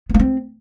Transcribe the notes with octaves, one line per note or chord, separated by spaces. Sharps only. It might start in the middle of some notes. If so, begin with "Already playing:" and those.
B3
A#3
C4